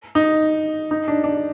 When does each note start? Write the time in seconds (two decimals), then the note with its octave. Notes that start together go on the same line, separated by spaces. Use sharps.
0.15 D#4
0.91 D#4
1.08 D4
1.24 D4